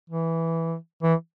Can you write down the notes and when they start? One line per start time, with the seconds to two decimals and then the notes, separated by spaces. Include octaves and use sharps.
0.10 E3
1.03 E3